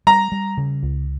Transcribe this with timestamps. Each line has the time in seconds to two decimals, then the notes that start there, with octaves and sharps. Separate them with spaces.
0.07 G3 A#5
0.32 G3
0.57 C#3
0.83 C#2